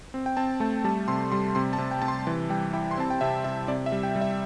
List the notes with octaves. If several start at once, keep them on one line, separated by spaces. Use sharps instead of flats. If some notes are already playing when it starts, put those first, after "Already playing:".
C4
G5
C4 A5
A3 A5
G3 A5
C3 C6
G3 C6
C3 C6
A5
C3
G5
C3 A5
C6
E3 A5
G3 G5
E4 G5
C6
C4 A5
G5
C3 E5
C3 E5
C3 D5
E5
G3
G5
G3
E5